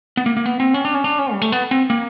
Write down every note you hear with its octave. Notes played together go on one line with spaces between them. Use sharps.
B3
A#3
A#3
B3
C4
C#4
D4
C#4
D4
C#4
G3
A3
B3
C4
A#3